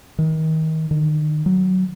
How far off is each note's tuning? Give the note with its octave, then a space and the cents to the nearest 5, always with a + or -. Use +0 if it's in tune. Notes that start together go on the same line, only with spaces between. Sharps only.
D#3 +30
D#3 -35
F#3 +10